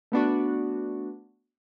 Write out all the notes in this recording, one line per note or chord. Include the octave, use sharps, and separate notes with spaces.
A3 B3 D4 F#4